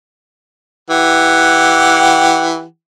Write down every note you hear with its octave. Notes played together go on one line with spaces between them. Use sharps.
E3 G4 F#5